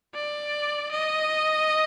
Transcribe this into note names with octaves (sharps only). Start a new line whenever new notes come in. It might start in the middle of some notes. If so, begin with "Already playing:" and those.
D5
D#5